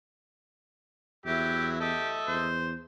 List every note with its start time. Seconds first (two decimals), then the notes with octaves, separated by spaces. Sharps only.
1.26 E2 F#3 E4 G4 E5
1.80 G4 A4 D#5 E5
2.28 E2 C5